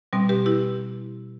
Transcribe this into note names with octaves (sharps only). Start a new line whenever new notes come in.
B2 G3 C4
G4 B4
E4 G4